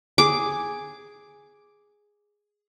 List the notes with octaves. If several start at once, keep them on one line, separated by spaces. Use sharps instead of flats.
G#4 D6